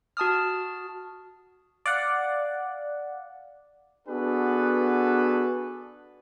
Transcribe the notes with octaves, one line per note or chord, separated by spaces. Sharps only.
F#4 A5 D#6 F6
D5 F5 F#5
B3 D4 F#4 G#4 A4 B4